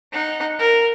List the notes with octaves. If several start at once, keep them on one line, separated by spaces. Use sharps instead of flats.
D#4 F#5
A#4